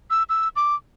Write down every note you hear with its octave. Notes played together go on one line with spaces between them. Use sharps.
E6
E6
D6